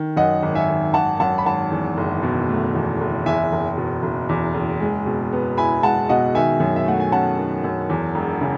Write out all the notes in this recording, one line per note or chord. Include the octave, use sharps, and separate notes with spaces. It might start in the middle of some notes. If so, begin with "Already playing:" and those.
Already playing: D#3
F#2 D#5 F#5
G#1
E5 G#5
D#3
G#1 F#5 A5
F#2 F#5 A5
B5
G#1 F#5 A5
E2
F#1
B2
A3
E2
F#1
E2 E5 G#5
F#1
B2
F#1
E2
F#1
G#3
B2
B3
E4 G#5 B5
G#3 F#5 A5
B2 D#5 F#5
D#3 E5 G#5
F#2
E5
A3 F#5
G#5
C#4 F#5 A5
D#3
F#2
E2
E1
C#3